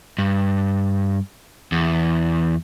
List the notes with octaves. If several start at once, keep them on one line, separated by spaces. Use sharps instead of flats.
G2
E2